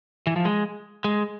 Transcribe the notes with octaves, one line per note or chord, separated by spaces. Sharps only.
E3
F3
G#3
G#3